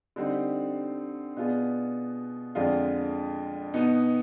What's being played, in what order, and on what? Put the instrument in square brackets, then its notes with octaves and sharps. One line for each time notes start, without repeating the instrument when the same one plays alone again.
[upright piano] D3 G3 C4 D#4
B2 B3 D4 F4 G#4
F2 D3 G#3 D4 F4
B2 B3 D#4